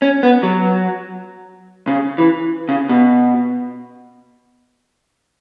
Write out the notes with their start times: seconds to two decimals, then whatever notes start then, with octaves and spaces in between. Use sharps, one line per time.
0.02 C#4
0.23 B3
0.43 F#3
1.87 C#3
2.18 E3
2.69 C#3
2.89 B2